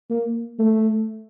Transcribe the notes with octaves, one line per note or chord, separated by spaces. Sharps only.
A#3
A3